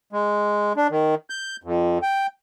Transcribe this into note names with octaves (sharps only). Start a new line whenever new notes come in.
G#3
D4
D#3
G6
F2
G5